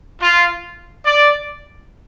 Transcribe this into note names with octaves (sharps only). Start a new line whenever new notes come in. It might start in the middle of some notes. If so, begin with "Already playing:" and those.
F4
D5